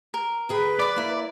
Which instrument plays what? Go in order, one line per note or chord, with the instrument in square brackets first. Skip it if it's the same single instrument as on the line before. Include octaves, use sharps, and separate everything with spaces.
[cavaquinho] A#4
[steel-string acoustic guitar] D2 G#4 G5 [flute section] B4
[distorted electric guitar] D5 [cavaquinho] B5 D6
[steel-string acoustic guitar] A#3 E4